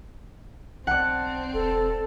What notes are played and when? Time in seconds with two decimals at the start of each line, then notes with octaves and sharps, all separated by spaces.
0.87 B1 C4 D5 F#5 A5
1.53 E1 A4